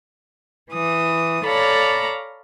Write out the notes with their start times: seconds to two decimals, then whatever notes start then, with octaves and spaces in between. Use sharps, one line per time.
0.71 E3 D#6
1.46 A4 C#5 D5 F5 A#5 B5